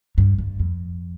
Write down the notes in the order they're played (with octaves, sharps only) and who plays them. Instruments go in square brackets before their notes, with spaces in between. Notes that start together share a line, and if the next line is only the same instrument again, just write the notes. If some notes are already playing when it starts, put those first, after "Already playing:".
[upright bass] G2
G2
F2